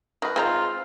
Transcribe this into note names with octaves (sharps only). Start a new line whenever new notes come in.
D#3 A#4 B4
G#3 C4 D#4 F4 A#5